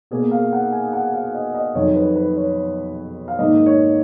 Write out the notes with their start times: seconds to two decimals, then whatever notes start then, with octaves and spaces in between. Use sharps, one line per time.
0.11 B2 A#3 G#4
0.31 F5
0.53 F#5
0.72 G#5
0.93 F#5
1.14 F5
1.34 D#5
1.55 D#5
1.75 F2 D#3 F#3 C#5
1.96 B4
2.16 B4
2.36 C#5
3.28 F5
3.39 G#2 D#3 A#3 D#5
3.66 C#5